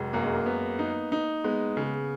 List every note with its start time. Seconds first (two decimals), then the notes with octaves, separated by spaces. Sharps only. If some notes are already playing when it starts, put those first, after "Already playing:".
Already playing: F1 F#3 G#3
0.13 F#2 A#3
0.24 G#3
0.35 A#3
0.46 B3
0.79 D#4
1.12 D#4
1.44 G#3 B3
1.77 C#3